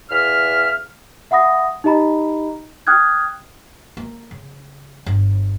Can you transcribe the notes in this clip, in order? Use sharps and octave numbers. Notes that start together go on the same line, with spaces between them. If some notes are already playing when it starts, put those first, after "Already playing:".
E2 E5 F5 F6
E5 F#5 B5 D#6 A#6
D#4 G4 D#5 A#5 B5
G5 D#6 F6 F#6 G#6
A#3
C#3
G1